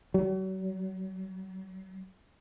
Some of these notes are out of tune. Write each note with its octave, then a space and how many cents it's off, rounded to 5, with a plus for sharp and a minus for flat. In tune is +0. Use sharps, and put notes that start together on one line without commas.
F#3 +40